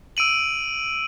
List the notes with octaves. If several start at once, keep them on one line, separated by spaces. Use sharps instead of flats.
E6 D7 D#7 F#7